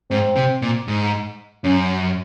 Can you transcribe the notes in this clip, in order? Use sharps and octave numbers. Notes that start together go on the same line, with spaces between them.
G#2 C4
C3
A#2
G#2
F#2 C#4